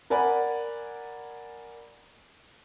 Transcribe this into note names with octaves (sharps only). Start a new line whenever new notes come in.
A#4 D5 F#5 G#5 B5